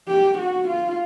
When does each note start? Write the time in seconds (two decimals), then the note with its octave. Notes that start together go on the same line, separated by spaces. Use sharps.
0.08 G4
0.38 F#4
0.68 F4